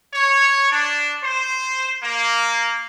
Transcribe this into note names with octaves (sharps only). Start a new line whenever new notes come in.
C#5
D4
C5
A#3